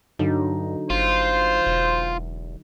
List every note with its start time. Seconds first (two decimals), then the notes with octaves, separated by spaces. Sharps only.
0.19 G2 D3 F#3 D#4
0.90 G1 F4 C5
1.66 E1